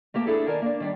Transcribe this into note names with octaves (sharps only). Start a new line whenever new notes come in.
A3 A#3 G4 A5
D4 E4 G#4 A4
D#3 A#4 D5 G#5 A5
A#3 D4
D#3 G3 D4